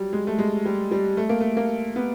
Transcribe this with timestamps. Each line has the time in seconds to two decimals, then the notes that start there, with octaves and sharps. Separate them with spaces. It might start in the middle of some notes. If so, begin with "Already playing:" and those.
Already playing: F#3 G3
0.13 G#3
0.27 A3
0.39 G#3
0.65 G3
0.91 G3
1.17 A3
1.29 A#3
1.41 A3
1.57 A#3
1.96 B3